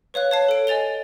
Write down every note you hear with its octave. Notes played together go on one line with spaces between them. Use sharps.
B4 C#5 F5 F#6
C#5 A5 C7
A4 D7
D#5 G#5 A6 F7 G7